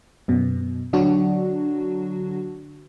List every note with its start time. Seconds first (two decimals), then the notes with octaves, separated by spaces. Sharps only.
0.28 F#2 B2
0.93 D3 F#3 D4 F#4